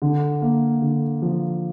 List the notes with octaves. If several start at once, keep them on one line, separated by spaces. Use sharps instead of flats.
D3
A#3
D3
F3